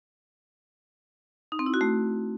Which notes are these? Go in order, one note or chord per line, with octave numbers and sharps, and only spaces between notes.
D#4
C4
E4
F#4
A3